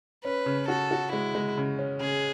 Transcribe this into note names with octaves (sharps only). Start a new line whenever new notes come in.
C#4 B4
C#3
F#4 A4
F#4
G#3 E4
G#3
C#3
C#4
C#3 G#4